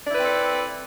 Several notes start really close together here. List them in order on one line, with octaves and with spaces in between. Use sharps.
D5 E4 B4 C4 A4